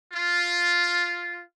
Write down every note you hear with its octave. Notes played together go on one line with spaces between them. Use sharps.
F4